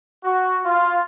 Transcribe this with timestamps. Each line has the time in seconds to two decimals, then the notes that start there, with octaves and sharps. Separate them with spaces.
0.24 F#4
0.65 F4